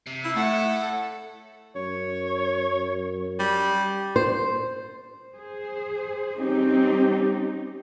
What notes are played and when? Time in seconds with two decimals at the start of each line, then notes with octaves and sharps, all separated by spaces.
0.07 C3
0.23 E4
0.36 A2 A3 A4 F#5
1.76 F#2 C#5
3.40 G3 G4
4.16 C5
5.34 G#4 C5
6.40 G3 C4 C#4 D#4 G4